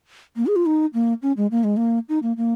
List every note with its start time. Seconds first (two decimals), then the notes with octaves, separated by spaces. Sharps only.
0.37 A#3
0.47 G#4
0.56 F4
0.66 D#4
0.94 A#3
1.22 C#4
1.37 G#3
1.51 A#3
1.64 G#3
1.77 A#3
2.09 D#4
2.23 A#3
2.37 A#3